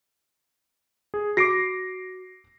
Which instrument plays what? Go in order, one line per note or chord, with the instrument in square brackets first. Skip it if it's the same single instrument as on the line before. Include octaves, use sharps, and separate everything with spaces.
[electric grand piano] G#4
[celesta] F#4 D6 [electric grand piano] A#6 C7 D7